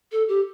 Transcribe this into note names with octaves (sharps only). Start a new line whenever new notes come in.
A4
G4